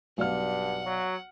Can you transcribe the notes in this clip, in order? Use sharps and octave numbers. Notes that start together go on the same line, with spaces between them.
B1 G2 D5 F#5 F6
F#3